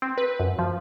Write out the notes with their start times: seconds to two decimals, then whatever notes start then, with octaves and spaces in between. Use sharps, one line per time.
0.02 C4
0.18 B4
0.40 F#2
0.59 F3